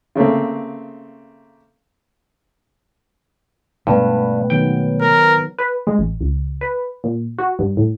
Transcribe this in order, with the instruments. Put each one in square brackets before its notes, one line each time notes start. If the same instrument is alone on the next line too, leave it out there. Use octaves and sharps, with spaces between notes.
[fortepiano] C#3 A3 A#3 C4
[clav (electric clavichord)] G2 [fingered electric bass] B2 G#3 A3 [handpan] B3 B4
[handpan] D#3 F#3 B3 [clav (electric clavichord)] G5
[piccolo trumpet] A#4
[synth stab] B4
G#3
A1
C#2
B4
A#2
F#4
G2
A2